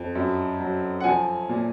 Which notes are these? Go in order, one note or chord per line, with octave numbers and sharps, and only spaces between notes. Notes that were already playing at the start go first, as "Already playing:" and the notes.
Already playing: F2
F#2
F#3
F#5
F3 G#5
A#2